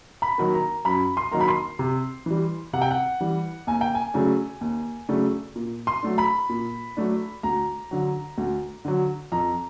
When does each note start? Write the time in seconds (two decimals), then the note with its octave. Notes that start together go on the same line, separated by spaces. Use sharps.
0.22 B5
0.38 D#3 F#3 A#3
0.54 A#5
0.85 F#2 B5
1.17 C6
1.32 D#3 F#3 A#3 A#5
1.40 B5
1.48 C6
1.79 C3
2.26 E3 G3
2.73 C3 F#5
2.82 G5
2.91 F#5
3.21 E3 G3
3.67 D#2 G#5
3.81 G5
3.95 G#5
4.14 C#3 F#3 A3 D4
4.61 D#2
5.08 C#3 F#3 A3 D4
5.56 A#2
5.87 C6
6.03 F#3 A3 D4
6.18 B5
6.49 A#2
6.97 F#3 A3 D4
7.43 D2 A#5
7.91 D3 F#3
8.38 D2
8.85 D3 F#3
9.32 F2 A#5